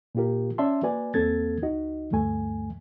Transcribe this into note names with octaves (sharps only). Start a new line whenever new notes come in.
A#2 A#3 F4 G4 A#4
C#4 D5 E5 A5 C6
A#3 F#4 B4 D5 G#5
E2 A#3 C4 A4 G#6 A6
C#2 D#4 F#4 D#5
D2 G2 A3 G#5